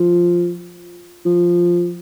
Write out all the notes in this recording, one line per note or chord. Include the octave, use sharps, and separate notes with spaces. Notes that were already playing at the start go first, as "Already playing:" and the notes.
Already playing: F3
F3